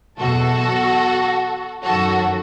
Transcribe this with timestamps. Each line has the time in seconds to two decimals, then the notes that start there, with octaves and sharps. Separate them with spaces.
0.19 E2 B2 F#3 F#4 A4
1.84 F#2 D#3 F#3 F#4 A4